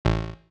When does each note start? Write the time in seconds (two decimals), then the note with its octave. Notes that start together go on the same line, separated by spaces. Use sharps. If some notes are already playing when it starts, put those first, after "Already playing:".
0.05 A1